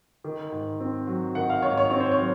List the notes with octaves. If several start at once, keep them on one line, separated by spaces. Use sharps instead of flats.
D#3
G#2
C4
F#3
D#3 F#5
F5
G#2 C#5
C#5
C4 C#5
C5
C#5
F#3